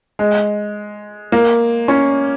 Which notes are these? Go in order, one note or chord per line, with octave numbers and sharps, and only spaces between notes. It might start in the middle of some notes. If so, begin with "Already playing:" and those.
G#3
A#3
C#4